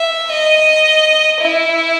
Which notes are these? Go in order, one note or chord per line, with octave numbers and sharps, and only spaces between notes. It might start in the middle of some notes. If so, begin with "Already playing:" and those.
Already playing: E5
D#5
E4